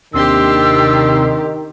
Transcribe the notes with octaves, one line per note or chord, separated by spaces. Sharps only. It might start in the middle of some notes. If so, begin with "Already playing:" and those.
D#2 C3 D#3 D4 G4 C6 E6